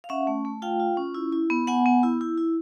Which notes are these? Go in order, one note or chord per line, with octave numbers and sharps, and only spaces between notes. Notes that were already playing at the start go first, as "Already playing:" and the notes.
F5
C#4 E5 F#5
A3
A3
F4 F5 G5
F4
C#4
E4
E4
B3
B3 F#5 G#5
B3
E4
E4
E4